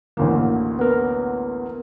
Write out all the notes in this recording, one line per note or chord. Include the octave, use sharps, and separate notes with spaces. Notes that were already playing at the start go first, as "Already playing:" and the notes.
A1 D2 A#3
B3 A#4